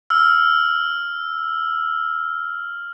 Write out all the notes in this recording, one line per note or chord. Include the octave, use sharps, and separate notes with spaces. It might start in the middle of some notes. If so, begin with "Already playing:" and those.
E6 F6